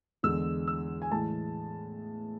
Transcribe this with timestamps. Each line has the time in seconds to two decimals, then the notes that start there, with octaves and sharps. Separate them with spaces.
0.23 E2 D3 G#3 E6
0.67 E6
1.02 G#5
1.11 A2 E3 G#3 A5